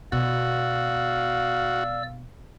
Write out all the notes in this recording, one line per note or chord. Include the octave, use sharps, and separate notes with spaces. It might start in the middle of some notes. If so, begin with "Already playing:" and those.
B2 F#4 D5 F5 E6